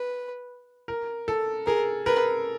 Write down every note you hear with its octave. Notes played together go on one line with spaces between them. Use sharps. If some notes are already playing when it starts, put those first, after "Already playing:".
Already playing: B4
A#4
A4
G#4 A#4
A#4 B4